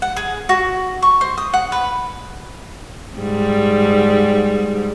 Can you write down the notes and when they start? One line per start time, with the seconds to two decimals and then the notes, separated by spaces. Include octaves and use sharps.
0.02 F#5
0.16 G#4
0.49 F#4
1.02 C#6
1.21 C5
1.38 D#6
1.54 F#5
1.72 B4
3.16 G#2 G3